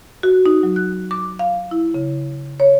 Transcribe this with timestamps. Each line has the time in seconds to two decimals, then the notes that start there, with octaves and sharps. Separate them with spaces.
0.23 F#4
0.46 D#4
0.63 F#3
0.76 F#6
1.11 D6
1.39 F5
1.71 E4
1.94 C#3
2.60 C#5